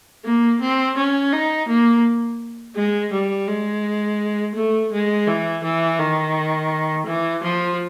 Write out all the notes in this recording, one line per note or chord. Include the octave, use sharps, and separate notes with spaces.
A#3
C4
C#4
D#4
A#3
G#3
G3
G#3
A3
G#3
E3
E3
D#3
E3
F3